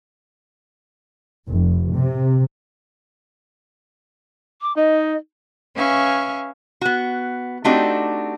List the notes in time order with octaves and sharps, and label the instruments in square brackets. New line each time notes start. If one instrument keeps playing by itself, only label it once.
[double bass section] F1
C3
[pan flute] D6
[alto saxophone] D#4 [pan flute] D#5
[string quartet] C#4 B4 E5 F5 G#5 C#6
[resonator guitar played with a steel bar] B3 F#4
A3 C4 D4 D#4 F#4 G4